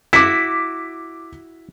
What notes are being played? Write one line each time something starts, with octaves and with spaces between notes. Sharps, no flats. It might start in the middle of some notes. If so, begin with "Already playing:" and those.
E4 F#4 D6 B6